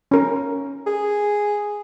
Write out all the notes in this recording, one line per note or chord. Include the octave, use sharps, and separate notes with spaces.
C#4 A#4
G#4